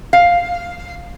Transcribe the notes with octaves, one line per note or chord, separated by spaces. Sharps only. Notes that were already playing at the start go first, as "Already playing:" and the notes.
F5